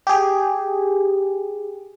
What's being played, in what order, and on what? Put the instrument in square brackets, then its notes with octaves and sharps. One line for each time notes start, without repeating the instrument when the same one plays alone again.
[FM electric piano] G4 G#4